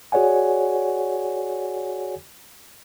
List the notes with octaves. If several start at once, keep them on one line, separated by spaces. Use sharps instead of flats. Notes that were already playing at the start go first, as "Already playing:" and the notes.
F#4 G#4 C#5 D5 F#5 G#5